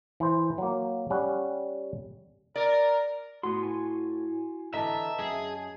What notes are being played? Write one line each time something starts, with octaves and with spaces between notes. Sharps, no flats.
E3 C5
F#3 A#3
G3 C#4 F#5
A#4 D5
A2 B3 F#4 C6
F4 G#5 C#6
D3 E3 D#5 E5 A5 A#5
F#2 G#4